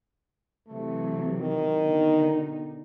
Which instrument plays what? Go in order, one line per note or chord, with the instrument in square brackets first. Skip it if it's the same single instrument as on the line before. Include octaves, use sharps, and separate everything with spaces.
[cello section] C3 E3 F#3 [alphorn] A3
[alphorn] D#3
[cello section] B2 D3 D#4